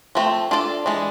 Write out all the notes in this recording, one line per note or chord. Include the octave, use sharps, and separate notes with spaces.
F3 A3 C4
D4 F4 A4 D5
E3 G#3 D4